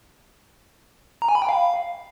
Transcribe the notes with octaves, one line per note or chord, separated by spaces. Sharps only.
A#5
G#5
B5
G5
F5